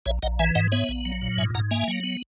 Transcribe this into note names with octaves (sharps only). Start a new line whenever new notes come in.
A#1 C#5 E5
A#1 D#5 F#5
E3 E5 G#5
G#2 D#5 F#5
B3 C#5 E5
A#1
F#3
A#2
G#2 E5 G#5
G#2 F#5 A#5
A#3 E5 G#5
F#3
B3